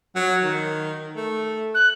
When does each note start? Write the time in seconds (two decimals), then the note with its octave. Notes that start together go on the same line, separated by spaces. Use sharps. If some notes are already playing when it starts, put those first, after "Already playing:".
0.16 F#3
0.43 D#3
1.16 A3
1.74 F#6